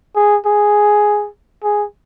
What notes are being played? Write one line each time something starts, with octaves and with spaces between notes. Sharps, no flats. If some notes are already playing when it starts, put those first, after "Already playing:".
G#4
G#4
G#4